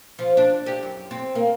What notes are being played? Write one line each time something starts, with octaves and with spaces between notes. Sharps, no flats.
F3
D4
G4
F#2
C4
A#3